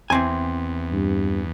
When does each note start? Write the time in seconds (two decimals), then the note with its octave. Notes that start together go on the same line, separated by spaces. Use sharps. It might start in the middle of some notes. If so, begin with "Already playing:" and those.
0.10 E2 E3 C4 G#5
0.92 G2